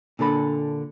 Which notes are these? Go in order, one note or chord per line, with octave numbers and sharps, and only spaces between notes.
A#2 D3 A4 B5